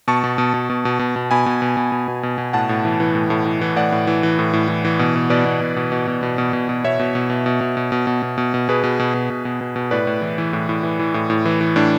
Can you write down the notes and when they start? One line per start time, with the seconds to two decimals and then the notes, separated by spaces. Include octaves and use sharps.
0.08 B2 A5 C#6
0.24 B2
0.38 B2
0.54 B2
0.70 B2
0.85 B2
0.99 B2
1.16 B2
1.31 B2 G#5 B5
1.46 B2
1.62 B2
1.77 B2
1.92 B2
2.08 B2
2.23 B2
2.38 B2
2.53 A2 F#5 A5
2.69 A2
2.85 E3
3.00 E3
3.15 A2
3.30 A2
3.46 E3
3.61 E3
3.76 A2 D5 F#5
3.92 A2
4.07 E3
4.23 E3
4.39 A2
4.53 A2
4.68 E3
4.85 E3
4.99 B2
5.16 B2
5.30 B2 B4 D5
5.45 B2
5.61 B2
5.76 B2
5.92 B2
6.07 B2
6.23 B2
6.38 B2
6.53 B2
6.69 B2
6.84 B2 C#5 E5
6.99 B2
7.15 B2
7.30 B2
7.46 B2
7.61 B2
7.77 B2
7.92 B2
8.07 B2
8.22 B2
8.38 B2
8.54 B2
8.69 B2 G#4 B4
8.84 B2
8.99 B2
9.14 B2
9.30 B2
9.45 B2
9.61 B2
9.76 B2
9.91 A2 B4 D5
10.07 A2
10.22 E3
10.38 E3
10.53 A2
10.69 A2
10.83 E3
10.99 E3
11.14 A2
11.30 A2
11.45 E3
11.61 E3
11.76 A2 D4